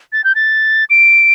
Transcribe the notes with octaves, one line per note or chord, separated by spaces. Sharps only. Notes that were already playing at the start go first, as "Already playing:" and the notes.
A6
G6
A6
D7